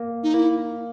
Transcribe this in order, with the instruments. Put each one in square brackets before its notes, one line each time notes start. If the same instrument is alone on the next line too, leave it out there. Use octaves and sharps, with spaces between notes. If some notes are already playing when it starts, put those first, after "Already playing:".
Already playing: [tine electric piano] A#3
[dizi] D#4
[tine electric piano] A#3 [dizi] E4